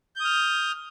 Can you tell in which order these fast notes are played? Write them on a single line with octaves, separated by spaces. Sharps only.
G6 D#6 F6